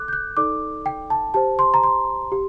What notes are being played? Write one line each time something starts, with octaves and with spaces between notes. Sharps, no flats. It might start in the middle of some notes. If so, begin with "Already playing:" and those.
Already playing: A4 D6 F#6
G6
F#6
D#4 A4 D5 D6
G5
A5
G4 C5 A5
C6
A#5
C6
G4